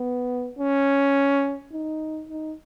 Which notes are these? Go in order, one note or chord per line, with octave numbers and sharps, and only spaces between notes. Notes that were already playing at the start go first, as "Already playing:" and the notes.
Already playing: B3
C#4
D#4
D#4